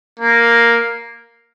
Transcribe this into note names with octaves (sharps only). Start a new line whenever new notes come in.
A#3